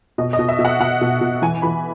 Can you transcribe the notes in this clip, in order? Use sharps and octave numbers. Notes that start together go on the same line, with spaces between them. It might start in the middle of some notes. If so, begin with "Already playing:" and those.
B2 D#5
D#5
B2
E5
B2
F#5
B2 F#5
B2
B2
E3 G#5
E3 B5